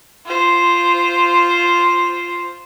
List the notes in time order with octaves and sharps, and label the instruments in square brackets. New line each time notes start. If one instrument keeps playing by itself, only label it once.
[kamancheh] F4 C5